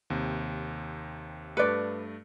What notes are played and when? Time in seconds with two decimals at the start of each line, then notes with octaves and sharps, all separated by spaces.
0.10 D#2 C3
1.57 G2 A3 B4 D5 C#7